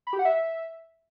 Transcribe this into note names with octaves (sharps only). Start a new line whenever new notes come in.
B5
G4
F#5
E5